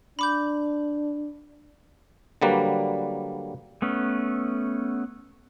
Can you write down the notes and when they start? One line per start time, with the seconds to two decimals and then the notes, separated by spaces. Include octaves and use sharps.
0.19 D4 B5 D6 G6
2.42 D3 F#3 G3 A#3 B4
3.82 A3 B3 C#4